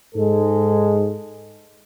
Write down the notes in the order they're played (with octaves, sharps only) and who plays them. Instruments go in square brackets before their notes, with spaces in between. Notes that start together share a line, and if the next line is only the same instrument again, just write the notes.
[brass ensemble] G#2 G#3 A4